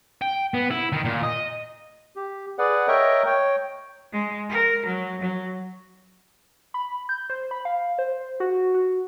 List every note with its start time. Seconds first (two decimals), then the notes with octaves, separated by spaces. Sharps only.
0.22 G5
0.54 B3
0.71 E4
0.92 D#3
1.05 A#2
1.23 D#5
2.16 G4
2.58 G#4 B4 D5 F#5
2.88 A#4 C#5 D#5 E5 G5 A#5
3.26 C#5 G5
4.12 G#3
4.50 A#4
4.86 F#3
5.21 F#3
6.74 B5
7.09 G6
7.30 C5
7.51 B5
7.65 F5
7.98 C5
8.40 F#4
8.74 F#4